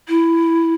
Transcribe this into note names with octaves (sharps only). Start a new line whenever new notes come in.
E4